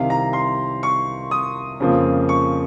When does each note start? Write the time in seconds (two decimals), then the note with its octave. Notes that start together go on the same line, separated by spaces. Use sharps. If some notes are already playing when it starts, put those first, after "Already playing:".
Already playing: C2 C3 D#3 F5
0.10 A#5
0.33 C6
0.83 C#6
1.31 D#6
1.80 F2 C#3 F3 A#3
2.29 C#6